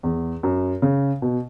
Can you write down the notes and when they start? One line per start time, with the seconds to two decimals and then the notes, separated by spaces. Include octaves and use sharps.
0.03 E2
0.43 F#2
0.82 C#3
1.22 B2